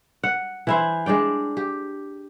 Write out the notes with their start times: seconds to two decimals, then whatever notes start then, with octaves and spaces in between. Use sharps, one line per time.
0.24 F#5
0.67 E3 E4 C5
1.06 G#3 D4 D5 G5
1.57 G4